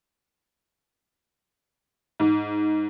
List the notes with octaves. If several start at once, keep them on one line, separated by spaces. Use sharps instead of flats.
G#2